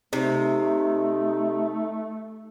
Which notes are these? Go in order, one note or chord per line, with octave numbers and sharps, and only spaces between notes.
C3 A3 D#4